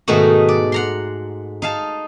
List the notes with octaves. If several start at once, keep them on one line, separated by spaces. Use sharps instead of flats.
G#2 B2 D#3 A3 D#4 F#4
D5
F#5 A#5 C6
D#4 F5 A5